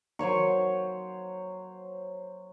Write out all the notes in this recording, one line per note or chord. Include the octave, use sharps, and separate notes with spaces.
F#3 C5 C#5 C#6